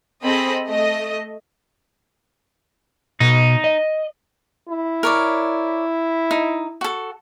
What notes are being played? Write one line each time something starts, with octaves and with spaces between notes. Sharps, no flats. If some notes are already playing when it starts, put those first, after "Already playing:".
C4 G#4 A4 D#5 B5
A3 D#5
B2 D#4
D#5
E4
A#4 C#5 D5
D#4
F#4 A4